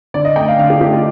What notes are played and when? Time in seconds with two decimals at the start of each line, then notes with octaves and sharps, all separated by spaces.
0.14 D3 D5
0.25 D#5
0.36 A3 G5
0.48 F5
0.58 D3 F5
0.70 G4
0.81 A3 G4
0.92 F4